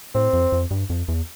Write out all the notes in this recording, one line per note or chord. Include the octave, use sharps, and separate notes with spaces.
A2 C4
F2
F2
G2
F2
E2